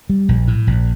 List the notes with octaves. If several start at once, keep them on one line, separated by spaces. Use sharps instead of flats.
G3
A#1
A2
A#1